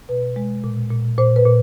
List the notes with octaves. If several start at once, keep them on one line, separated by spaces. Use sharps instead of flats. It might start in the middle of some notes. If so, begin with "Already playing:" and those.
B2 B4
G#3
A#2
A#2
A#2 C5
B4
A#2